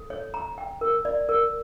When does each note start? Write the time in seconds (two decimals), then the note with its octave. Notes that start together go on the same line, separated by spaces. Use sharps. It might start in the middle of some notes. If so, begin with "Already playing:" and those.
Already playing: A4
0.10 C#5
0.34 A#5
0.58 G5
0.81 A#4
1.05 D5
1.29 A#4